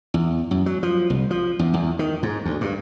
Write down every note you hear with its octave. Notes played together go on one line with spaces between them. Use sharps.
E2
F#2
F#3
F3
C2
F3
E2
E2
D#3
G#2
D2
G2